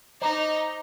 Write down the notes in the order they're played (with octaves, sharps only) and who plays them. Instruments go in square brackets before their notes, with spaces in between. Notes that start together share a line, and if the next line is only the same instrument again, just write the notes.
[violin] D#4 [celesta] C5 D#5 A#5 D6